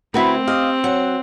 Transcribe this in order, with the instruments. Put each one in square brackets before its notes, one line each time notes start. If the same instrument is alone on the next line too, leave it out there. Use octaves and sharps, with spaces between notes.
[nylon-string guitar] D2 B3 A#4 [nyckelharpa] C4 [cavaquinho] E4 F#4 B4
[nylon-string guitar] G4 [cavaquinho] D#5 F5
[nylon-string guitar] F#3 [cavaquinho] F#5